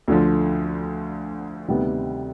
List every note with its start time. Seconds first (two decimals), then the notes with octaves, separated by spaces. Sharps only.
0.08 D2 D3 F3
1.68 D2 C3 D#3 G3 B3